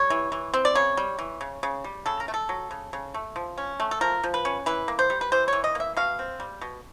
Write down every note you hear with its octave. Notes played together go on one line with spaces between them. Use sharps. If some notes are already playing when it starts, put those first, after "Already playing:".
Already playing: G3 C#5
E3
E3
C4
D5
C#3 C#5
G3
E3
C#3
C#3
G3
C#3 A4
A#4
A3
A4
F#3
C#3
C#3
A3
F3
C#4
A3
A4
F3 A#4
F3
B4
C#4
E3 B4
A#3
C5
G3
B4
E3 C5
E3 C#5
D#5
A#3 E5
B2 F5
C4
G3
B2